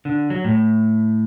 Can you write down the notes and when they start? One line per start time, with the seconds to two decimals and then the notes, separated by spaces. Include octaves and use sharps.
0.05 D3
0.30 F#3
0.44 A2